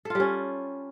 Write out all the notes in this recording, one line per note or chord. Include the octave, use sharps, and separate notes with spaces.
G3 C#4 F4 A4